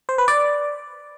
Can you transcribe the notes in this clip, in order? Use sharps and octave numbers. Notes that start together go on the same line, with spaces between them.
C5
B4
D5